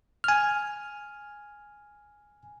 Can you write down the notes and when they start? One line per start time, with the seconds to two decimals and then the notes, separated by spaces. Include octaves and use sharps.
0.24 G#5 F6